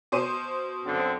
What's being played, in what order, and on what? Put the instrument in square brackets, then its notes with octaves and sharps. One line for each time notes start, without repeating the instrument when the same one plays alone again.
[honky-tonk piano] B2 C5 D#7
[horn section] F#2 D3 C4